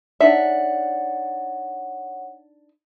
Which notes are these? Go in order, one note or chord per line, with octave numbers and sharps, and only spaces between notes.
D4 D#4 C#5 E5 F#5